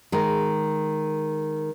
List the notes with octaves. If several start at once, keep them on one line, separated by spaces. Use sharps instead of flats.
D#3 G#3